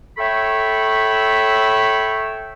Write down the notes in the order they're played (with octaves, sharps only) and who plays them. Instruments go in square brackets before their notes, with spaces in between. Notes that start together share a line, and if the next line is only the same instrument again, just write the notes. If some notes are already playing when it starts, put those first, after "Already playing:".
[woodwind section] A4 C#5 E5 G5 B5 C#6